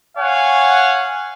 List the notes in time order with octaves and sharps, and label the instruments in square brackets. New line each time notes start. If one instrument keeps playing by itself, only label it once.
[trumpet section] C#5 F5 F#5 G#5